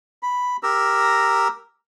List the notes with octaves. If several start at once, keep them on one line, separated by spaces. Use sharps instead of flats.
B5
G4 A#4 A#5 E6